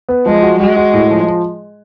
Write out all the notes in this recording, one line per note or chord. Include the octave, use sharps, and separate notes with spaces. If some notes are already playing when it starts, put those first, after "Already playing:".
B3
F3 G#3
F#4
G#3 F#4
F#4
A2
F3
F3